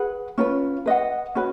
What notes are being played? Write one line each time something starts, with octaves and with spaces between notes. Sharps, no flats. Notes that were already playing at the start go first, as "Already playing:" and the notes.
Already playing: G#4 B4 F#5 B5
C#4 F4 B4
B4 D#5 F#5
C#4 F#4 B4